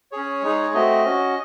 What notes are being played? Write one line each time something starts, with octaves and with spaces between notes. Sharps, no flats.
C#4 G#4 C#5
G#3 D#4 G#4
A3 C4 F#4 D#5
C#4 F#4